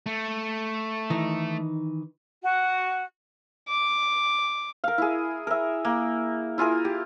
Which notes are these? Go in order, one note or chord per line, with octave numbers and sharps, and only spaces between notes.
A3
D#3 E3 D#4
F#4
D6
A#4 F5
E4 G#4
A#4 E5
A#3
E4 F4 G#4 A#4
G4